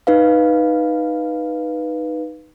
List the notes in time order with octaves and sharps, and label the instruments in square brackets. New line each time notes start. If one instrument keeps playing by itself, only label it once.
[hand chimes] D#4 B4 F5